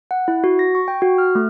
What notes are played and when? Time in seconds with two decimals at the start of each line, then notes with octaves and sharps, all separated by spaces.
0.11 F#5
0.28 E4
0.44 F#4
0.59 A#6
0.75 C#6
0.88 G5
1.02 F#4
1.18 F6
1.35 A3